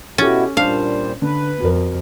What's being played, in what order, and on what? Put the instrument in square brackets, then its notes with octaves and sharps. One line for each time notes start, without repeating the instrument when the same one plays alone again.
[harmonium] B2 E4 F#4 [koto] C#4 [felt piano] G4 A4
[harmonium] A#2 G3 C5 [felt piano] D4 [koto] F5
[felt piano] D3 [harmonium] B4
[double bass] F2 [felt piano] F#4 A#4